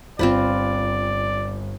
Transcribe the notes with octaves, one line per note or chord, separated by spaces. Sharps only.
G1 C4 F4 B4 C5 D5 F#7